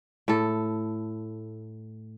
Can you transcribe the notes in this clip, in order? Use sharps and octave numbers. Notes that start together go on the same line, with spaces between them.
A2 A4